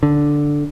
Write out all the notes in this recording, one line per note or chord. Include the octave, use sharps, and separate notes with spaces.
D3